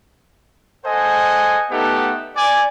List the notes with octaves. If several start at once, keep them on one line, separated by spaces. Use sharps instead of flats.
A4 C5 D#5 F#5 G#5
A3 B3 D#4 G4 A4 F#5
D5 G#5